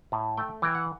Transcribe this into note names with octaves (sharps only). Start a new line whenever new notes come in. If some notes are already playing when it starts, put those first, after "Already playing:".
A2
A3 G5
E3 G5
F#5